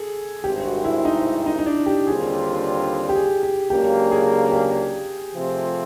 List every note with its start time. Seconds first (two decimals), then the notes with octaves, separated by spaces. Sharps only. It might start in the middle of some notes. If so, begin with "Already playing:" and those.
Already playing: G#4 A4
0.44 G#1 G2 D#3 G#3 C4 G4
0.64 F#4
0.84 E4
1.05 D#4
1.46 D#4
1.59 D#4
1.66 D4
1.86 G4
2.06 D#2 D3 G3 C4 F4 G#4
3.09 G4
3.15 G#4
3.43 G4
3.70 C#2 C#3 F#3 A#3 D4 G4
4.11 G#4
4.52 G4
5.34 C3 F3 A3 C4 F4